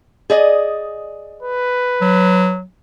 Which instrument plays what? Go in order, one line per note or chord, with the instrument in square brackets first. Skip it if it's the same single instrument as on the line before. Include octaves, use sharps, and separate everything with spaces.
[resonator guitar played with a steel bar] G#4 D5 D#5
[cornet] B4
[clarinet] F#3